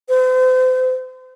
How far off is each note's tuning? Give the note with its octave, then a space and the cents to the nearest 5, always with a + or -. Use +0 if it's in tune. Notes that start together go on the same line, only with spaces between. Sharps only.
C5 -40